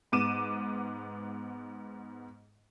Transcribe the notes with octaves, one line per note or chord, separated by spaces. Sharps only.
G#2 B3 D6 D#7 E7